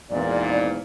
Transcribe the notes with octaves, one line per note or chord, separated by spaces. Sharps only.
G#1 E2 A#2 D5